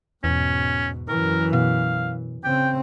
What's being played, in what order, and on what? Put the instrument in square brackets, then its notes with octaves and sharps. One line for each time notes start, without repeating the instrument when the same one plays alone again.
[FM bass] E2 [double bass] G#2 B2 [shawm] C#4
[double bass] F#2 E3 [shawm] A#4
[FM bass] B2 [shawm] F5
[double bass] C#3 C4 [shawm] G5